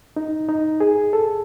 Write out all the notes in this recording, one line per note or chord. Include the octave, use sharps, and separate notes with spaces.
D#4
D#4
G#4
A4